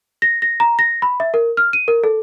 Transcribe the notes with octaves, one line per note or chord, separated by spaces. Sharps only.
A#6
A#6
A#5
A#6
B5
E5
A#4
F6
D#7
A#4
A4